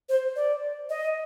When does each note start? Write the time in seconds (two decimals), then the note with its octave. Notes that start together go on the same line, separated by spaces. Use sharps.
0.09 C5
0.36 D5
0.90 D#5